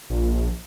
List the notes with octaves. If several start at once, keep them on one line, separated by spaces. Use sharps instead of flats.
A#1